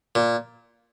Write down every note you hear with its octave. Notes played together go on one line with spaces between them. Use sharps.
A#2